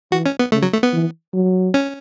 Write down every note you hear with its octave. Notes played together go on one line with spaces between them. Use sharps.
E3 F#4
C#4
B3
C#3 A3
F#3
A3
B3
E3
F#3
C#4